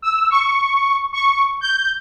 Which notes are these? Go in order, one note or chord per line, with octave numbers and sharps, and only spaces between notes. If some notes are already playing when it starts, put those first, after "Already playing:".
E6
C#6
C#6
G6